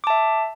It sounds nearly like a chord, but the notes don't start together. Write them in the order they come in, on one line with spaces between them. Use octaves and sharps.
D6 A5 E5